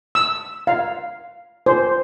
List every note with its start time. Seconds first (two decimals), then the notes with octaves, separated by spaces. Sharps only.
0.15 E6
0.67 F5
1.66 C5